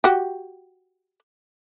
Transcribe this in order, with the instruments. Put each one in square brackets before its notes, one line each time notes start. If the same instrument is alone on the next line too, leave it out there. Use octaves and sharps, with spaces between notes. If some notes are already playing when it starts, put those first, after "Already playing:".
[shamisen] F#4 G4